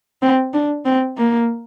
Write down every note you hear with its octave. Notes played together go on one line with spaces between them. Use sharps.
C4
D4
C4
A#3